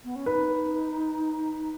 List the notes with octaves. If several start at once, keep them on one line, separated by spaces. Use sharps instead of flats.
B3
C#4
D#4 B4